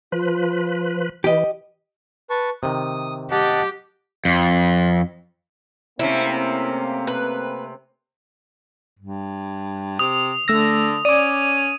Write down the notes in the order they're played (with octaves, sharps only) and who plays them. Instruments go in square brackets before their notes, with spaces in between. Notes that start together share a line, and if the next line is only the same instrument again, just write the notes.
[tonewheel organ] F3 B4 [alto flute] F4
[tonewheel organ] E3 [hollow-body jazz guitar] G4 D#5
[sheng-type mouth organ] B4 A5 C#6
[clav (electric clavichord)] C3 D#3 [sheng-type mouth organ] D#6
[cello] G4 [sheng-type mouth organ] D#5 F#5 A5
[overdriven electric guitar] F2
[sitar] C3 C#4 [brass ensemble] A3 A#3 C4 [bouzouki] E4
[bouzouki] B4
[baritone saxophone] G2
[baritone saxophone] C3 [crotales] D#6
[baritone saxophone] D3 [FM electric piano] A3 E6 A#6
[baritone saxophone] C#4 [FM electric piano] D5 D6 [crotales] D#7